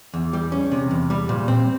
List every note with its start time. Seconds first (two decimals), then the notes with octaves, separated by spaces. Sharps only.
0.14 E2
0.33 G3
0.52 C#4
0.72 C3
0.91 E2
1.10 G3
1.29 A#2
1.48 C4